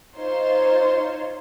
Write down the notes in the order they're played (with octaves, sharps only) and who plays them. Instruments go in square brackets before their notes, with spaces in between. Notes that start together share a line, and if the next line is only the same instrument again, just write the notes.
[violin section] D#4 F4 C5 C#5 C6